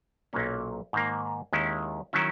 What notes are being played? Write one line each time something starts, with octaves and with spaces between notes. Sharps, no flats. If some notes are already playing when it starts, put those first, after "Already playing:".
B1 A#2 F#3 A#3 C#4
G#2 D#3 A#3
D#2 D#3 G#3 C#4 E4
D#3 F#3 C#4 E4